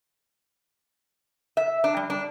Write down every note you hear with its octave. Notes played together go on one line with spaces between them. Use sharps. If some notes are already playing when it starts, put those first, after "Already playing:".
E5
D4
G3
D4